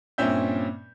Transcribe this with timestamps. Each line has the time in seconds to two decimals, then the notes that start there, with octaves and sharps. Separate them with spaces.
0.18 G2 A#2 C4 C#4 E5 G6